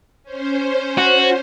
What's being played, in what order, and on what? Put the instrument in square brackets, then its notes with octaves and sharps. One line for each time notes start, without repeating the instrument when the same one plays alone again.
[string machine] C#4 C5
[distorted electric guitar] F#4